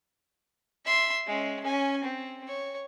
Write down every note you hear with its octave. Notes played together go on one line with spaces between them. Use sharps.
E5 C6
G#3 C#4
C#4 G#5
C4
C#5